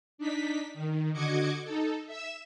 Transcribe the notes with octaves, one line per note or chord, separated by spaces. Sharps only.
D4 D#4 B6
D#3
D3 F#4 D#5 D6 G#6 C#7
D#4 A4
E5 E6